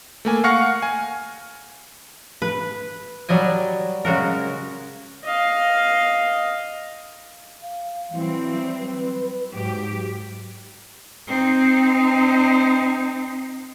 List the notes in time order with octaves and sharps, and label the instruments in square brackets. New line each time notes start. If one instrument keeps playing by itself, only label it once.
[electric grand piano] A3 A#3 G#5
F5 F#5 C#6 F6 A#6 C#7
G#5
[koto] B4
F#3 G3 D#5 G#5
C#3 G#3 F#4 A#4
[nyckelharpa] D#5 F5
[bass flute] F5
[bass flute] E3 [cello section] F#3 G3 C4
[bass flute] B4
[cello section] G#2 G4 [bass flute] F#3
[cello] C4 D#4